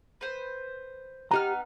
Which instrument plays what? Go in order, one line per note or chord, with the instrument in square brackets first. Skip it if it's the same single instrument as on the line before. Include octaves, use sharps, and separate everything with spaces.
[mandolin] B4 C5
[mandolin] B3 D#4 F6 [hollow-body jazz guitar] G4 A#5